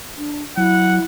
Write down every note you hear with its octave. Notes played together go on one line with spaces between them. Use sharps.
D4
F#3 E4 F#5